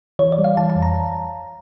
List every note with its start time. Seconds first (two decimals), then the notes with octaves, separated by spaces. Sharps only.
0.19 E3 C#5
0.32 D5
0.38 G3
0.44 F5
0.57 E3 A5
0.70 A5
0.76 F2
0.82 A#5